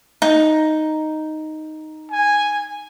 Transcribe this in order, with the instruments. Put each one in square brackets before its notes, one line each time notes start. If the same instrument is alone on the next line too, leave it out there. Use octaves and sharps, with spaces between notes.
[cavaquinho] D#4
[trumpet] G#5